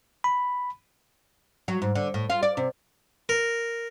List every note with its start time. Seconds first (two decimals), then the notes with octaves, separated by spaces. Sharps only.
0.24 B5
1.68 F#3
1.82 G#2
1.95 D3
2.14 A2
2.30 F4
2.43 D5
2.57 C3
3.29 A#4